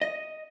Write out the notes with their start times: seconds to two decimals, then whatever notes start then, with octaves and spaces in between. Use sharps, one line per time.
0.02 D#5